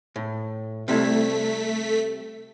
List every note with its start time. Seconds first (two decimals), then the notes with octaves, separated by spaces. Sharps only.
0.16 A2
0.88 C3 G3 A3 E4 B6